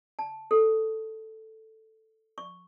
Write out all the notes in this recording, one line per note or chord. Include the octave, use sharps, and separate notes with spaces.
A5
A4
C#6